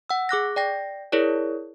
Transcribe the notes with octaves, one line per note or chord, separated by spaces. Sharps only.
F#5 E6
G#4 D6 F#6 A#6
D5 G5 A#6
E4 G#4 A#4 C#5 D5